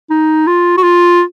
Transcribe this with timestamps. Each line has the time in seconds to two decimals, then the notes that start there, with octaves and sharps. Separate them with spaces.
0.10 D#4
0.47 F4
0.77 F#4
0.83 F4